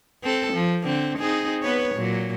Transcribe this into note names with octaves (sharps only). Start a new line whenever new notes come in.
C4 A4
F3
D3 C4
C4 D#4 G#4
B3 B4 C#5
A#2 F#3